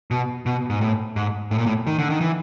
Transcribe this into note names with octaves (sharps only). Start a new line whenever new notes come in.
B2
B2
G#2
A2
G#2
A2
A#2
A2
D#3
D3
D#3
E3